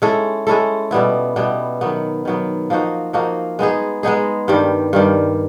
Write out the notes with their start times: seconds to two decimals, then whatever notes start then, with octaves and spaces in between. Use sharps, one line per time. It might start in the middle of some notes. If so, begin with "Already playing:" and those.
0.02 G#3 C#4 E4 A4
0.47 G#3 C#4 E4 A4
0.91 B2 G3 B3 E4
1.36 B2 G3 B3 E4
1.81 D#3 F#3 B3
2.25 D#3 F#3 B3
2.70 F3 A#3 D#4 F#4
3.13 F3 A#3 D#4 F#4
3.59 G#3 B3 D#4 G#4
4.03 G#3 B3 D#4 G#4
4.48 G2 D#3 G3
4.93 G2 D#3 G3